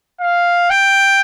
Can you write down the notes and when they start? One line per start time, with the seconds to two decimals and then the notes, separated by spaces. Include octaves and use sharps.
0.21 F5
0.70 G5